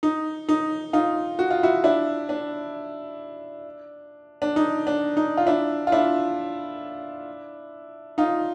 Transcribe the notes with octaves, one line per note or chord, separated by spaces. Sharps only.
D#4
D#4
D#4 F4
F#4
F4
E4 F#4
D4 E4
D4
D4
D#4
D4
D#4
F4
D4 E4
F4
D4 E4
D#4 F4